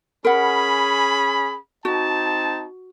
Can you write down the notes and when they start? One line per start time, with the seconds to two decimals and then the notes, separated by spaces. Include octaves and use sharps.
0.25 C#4 G#4 A#4 F#5 B5
1.85 C4 D#4 F#4 A5